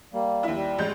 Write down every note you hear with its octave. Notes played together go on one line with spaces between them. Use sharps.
G3 A#3
D#2 E4
G3
A1 G#3 G6